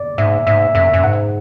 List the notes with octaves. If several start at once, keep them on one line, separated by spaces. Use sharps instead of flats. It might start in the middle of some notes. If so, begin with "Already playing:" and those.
Already playing: D5
G#2 E5
G#2 E5
F#2 E5
F#2
G#2 F#5